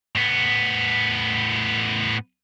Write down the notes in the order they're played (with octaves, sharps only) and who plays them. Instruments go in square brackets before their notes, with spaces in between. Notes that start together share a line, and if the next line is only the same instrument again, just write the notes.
[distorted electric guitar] A2 B3